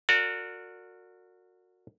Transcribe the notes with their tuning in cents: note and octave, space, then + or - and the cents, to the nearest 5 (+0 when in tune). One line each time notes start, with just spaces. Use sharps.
F#4 -25 A#4 -35 D5 +0